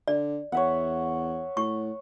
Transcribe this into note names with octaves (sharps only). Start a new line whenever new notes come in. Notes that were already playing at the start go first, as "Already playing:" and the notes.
D3 D5
E2 C#5 E5 F#5
A2 C#6